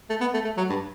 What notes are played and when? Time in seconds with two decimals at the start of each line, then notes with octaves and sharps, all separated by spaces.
0.10 A3
0.21 B3
0.34 A3
0.45 A3
0.57 F#3
0.69 G2